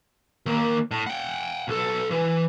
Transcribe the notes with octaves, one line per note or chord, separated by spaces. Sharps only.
D#3 A#3
A2
F#5 G5
B1 A4
E3